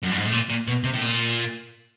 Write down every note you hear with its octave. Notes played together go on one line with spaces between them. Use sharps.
F#2
G2
G#2
A2
A#2
A#2
B2
C3
A2
A#2